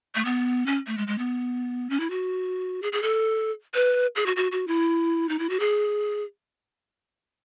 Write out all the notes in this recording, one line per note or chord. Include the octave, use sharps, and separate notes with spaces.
A3
B3
C#4
A3
G#3
G#3
B3
C#4
E4
F#4
G#4
G#4
A4
B4
G#4
F#4
F#4
F#4
E4
D#4
E4
F#4
G#4